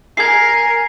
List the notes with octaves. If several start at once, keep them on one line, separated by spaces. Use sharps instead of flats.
A#4 G#5 G#6 C7